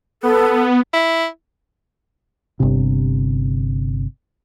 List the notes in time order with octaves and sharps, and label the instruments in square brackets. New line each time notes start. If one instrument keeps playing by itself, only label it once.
[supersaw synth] B3 [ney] A4
[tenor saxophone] E4
[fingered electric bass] G1 C3